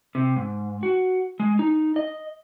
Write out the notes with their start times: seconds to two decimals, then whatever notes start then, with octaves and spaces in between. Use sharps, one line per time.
0.15 C3
0.36 G#2
0.83 F#4
1.40 G#3
1.59 D#4
1.96 D#5